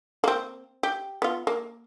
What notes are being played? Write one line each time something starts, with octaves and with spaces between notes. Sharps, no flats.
A#3 C4
G4
B3 F4
A#3